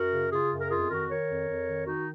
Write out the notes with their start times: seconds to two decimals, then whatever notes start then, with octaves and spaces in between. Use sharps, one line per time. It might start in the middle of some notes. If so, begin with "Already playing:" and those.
Already playing: F#2 F#4 A#4
0.13 C#3
0.31 C#3 F4 G#4
0.51 F#2
0.61 A#4
0.70 F2 F4 G#4
0.90 D#3 F#4 A#4
1.09 D#3 A#4 C#5
1.29 F2
1.48 F2
1.68 D#3
1.86 D#3 D#4 F#4